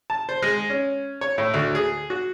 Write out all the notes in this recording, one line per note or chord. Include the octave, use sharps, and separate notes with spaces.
A5
C5
G#3
C#4
C#5
A2
D2
G#4
F#4